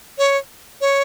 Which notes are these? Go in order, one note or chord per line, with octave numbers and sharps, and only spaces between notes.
C#5
C#5